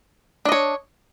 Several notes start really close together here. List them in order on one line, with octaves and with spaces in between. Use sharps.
D4 D#5 C#5